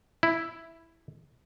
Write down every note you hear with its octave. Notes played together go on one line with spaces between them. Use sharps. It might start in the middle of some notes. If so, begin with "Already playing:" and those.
E4